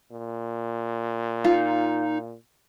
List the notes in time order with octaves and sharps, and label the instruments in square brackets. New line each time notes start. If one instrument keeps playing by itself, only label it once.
[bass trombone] A#2
[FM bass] D#4 [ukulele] F4